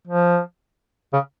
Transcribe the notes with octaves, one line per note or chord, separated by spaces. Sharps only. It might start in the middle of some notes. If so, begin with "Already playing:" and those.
F3
C#3